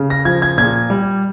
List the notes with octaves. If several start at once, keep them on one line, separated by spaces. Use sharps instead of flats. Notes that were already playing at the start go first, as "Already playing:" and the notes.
Already playing: C#3
A#6
F3 G#6
G#6
A#2 G#6
G3